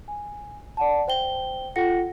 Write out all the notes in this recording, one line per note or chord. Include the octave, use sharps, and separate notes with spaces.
G#5
D5 F#5 A5
C5 G5 G7
F4 A4 F#5 G5 A#6 C#7